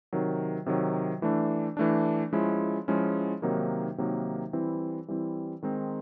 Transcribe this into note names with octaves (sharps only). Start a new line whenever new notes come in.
C3 D#3 F#3
C3 D#3 F#3
E3 A3 D4
E3 A3 D4
F3 G#3 C#4 E4
F3 G#3 C#4 E4
C3 D#3 F#3 A#3 D#4
C3 D#3 F#3 A#3 D#4
E3 G3 C4 E4
E3 G3 C4 E4
D#3 G#3 C4 D#4